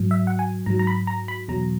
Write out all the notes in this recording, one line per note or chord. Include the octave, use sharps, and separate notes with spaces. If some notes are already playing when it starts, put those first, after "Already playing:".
Already playing: G#2 F#3
E5
F#5
G#5
G#2 F#3 A#5
A#5
B5
A#5
B5
E2 B2 F#3 A#5